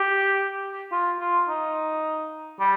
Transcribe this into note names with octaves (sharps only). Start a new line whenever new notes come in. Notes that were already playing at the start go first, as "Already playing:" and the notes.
Already playing: G4
F4
F4
D#4
G3